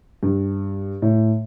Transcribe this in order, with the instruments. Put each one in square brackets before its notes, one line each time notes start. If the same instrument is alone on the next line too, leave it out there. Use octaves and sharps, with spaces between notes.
[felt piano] G2
A2